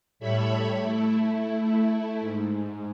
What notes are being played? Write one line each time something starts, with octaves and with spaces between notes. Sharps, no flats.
A2 G3 A3 C#5 E5 B5
A3 E4
G#2